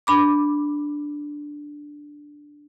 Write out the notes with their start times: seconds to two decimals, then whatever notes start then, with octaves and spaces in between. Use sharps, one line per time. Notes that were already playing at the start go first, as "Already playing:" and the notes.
0.07 D4 B5 D6